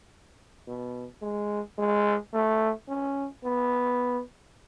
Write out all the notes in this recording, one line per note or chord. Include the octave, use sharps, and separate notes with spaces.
B2
G#3
G#3
A3
C#4
B3